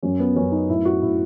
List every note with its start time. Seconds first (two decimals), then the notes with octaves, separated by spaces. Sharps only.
0.03 F#2 C#4
0.19 B3
0.36 F#2 C#4
0.52 D#4
0.68 A2 E4
0.85 F#4
1.02 A2 E4